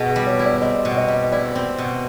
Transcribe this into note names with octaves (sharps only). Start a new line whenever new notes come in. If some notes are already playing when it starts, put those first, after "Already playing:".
Already playing: B2 G#4
G3
C#5
E4
D5
C4 D#5
B2
D#5
G3
E4 D5
C4
B2